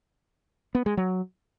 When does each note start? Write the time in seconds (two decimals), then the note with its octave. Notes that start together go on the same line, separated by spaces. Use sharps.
0.75 B3
0.86 G#3
0.97 F#3